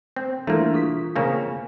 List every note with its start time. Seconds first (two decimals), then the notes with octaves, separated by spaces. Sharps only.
0.16 C4
0.47 E3 A3 A#3 D4 E4
0.74 F4 D#6 B6
1.16 C#3 A#3 C4 F5 G#5